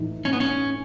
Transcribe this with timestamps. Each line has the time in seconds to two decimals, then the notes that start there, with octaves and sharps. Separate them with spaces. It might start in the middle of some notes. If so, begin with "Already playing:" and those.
Already playing: A2 E3 A3 D#4
0.25 C#4
0.33 B3
0.40 C#4